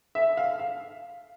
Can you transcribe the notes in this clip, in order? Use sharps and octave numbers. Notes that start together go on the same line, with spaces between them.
E5
F5
F5